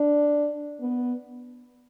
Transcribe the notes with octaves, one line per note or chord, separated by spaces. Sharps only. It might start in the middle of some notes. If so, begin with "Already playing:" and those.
Already playing: D4
B3